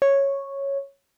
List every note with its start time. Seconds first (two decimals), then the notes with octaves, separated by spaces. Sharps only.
0.02 C#5